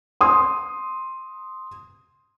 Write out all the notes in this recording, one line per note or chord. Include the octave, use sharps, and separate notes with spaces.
C6 D#6